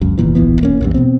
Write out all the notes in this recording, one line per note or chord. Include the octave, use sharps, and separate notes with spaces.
C#2 F#2
F1 E2 A#2 E3
D1 A#1 E3 B3
E1 A#3 C#4
A#1 E2 G2
B2 B3 C4